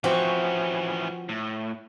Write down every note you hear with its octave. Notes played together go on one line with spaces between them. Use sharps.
E3 F3 C4 C#4 F#4
A2